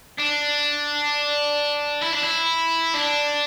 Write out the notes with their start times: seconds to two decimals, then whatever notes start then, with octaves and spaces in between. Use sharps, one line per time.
0.18 D4
2.02 E4
2.13 D4
2.23 E4
2.94 D4